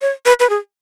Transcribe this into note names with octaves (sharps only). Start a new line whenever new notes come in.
C#5
B4
B4
G#4